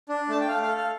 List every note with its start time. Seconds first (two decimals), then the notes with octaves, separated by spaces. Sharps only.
0.09 D4
0.29 A3 A5
0.41 G5
0.48 A3 F5
0.63 A4 F5
0.78 F5